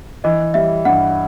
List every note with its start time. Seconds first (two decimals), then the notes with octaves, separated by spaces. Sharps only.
0.24 E3 D#5
0.54 G3 E5
0.85 G2 F#5